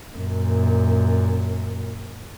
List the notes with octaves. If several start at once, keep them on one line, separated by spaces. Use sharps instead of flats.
F#2 A#2